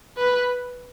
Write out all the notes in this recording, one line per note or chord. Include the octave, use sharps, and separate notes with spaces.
B4